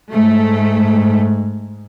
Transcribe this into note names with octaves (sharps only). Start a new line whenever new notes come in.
G#2 A3